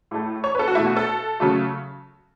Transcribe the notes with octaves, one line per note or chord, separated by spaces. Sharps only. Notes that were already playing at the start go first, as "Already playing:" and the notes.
A2 A3
C#5
B4
A4
F#4
B2 A3 E4
F#4
A4
C#3 F#3 A3